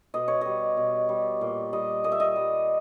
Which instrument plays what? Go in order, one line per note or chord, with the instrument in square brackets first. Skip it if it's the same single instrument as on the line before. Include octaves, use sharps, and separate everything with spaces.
[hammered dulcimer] B2 D#5
C#5
G3 D#5
B2
G3
A#2
G3 D#5
A#2 D#5
E5
D#5
G3